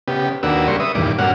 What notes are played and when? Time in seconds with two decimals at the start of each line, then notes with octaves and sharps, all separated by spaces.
0.08 C#3 B3 G4
0.43 D#2 A#3 D4 F#4 B4 E6
0.68 C#3 G3 A#3 C6 C#6
0.80 B4 E5 D#6
0.95 E2 G2 A#2 D#3 D6
1.18 G2 A#2 C#4 F#4 F#5 F6